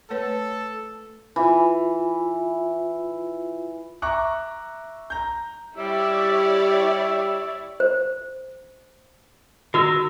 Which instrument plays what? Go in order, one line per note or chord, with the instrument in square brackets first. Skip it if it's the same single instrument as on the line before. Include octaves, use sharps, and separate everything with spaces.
[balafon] A3 B4 C#5 [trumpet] A4
[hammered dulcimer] E3 [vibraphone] F4
[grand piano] E5 A#5 C#6 D6 F#6
A#5 G6
[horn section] G3 [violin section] E4 C#5 D5 [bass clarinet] G4 [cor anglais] E5
[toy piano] C5
[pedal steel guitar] D#3 A#4 E6 [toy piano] F#4